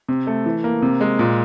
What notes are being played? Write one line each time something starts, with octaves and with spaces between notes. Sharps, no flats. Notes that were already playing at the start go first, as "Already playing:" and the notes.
C3
A3
E3
A#3
C3
G#3
A#2